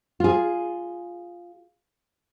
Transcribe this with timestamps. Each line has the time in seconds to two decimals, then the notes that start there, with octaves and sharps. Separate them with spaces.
0.20 F4 G#4